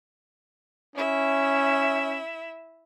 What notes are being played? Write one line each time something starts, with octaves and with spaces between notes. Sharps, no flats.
C#4 E4 E5